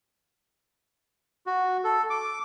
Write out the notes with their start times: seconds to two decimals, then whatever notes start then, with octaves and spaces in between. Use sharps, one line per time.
1.47 F#4
1.84 A4
2.10 D6